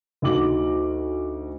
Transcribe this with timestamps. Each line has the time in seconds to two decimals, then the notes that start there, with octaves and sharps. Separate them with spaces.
0.22 D2 D#4 F#4 D6 F#7